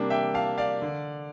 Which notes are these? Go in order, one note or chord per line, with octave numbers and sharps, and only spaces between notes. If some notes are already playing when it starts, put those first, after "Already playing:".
Already playing: C3 G3 A#3 D4
E5 G5
F5 A5
D5 F5
D3